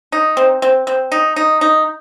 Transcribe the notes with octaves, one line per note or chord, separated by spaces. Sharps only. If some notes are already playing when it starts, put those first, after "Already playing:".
D#4
C4
C4
C4
D#4
D#4
D#4